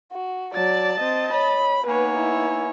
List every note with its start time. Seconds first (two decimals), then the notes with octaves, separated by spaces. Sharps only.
0.12 F#4
0.54 F#3 D5 A5 A6
1.00 C4 D#5
1.33 C#5 B5
1.87 A#3 B3 D#4 B4 C#5 G#5
2.18 E4